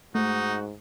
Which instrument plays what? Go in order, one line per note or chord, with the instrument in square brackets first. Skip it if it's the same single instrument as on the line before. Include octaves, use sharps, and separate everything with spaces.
[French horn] G#2 [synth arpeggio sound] A3 [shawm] D#4 [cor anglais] F#4